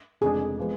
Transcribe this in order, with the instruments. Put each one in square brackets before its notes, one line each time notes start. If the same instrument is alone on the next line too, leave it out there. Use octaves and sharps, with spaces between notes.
[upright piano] F1 F2 C#3 G#3 D4 [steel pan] G#4
[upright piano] F3 G#3 B3